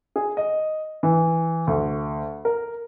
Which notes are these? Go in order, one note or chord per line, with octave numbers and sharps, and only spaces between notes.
G#4
D#5
E3
D2
A#4